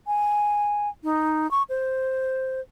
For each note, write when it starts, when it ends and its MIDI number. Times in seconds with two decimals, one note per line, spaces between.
0.07 0.89 80
1.04 1.50 63
1.51 1.63 85
1.69 2.61 72